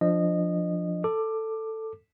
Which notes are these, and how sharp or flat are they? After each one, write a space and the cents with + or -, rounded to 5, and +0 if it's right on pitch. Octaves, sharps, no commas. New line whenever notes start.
F3 +0 D4 +0 D#5 -20
A4 +10 D6 +15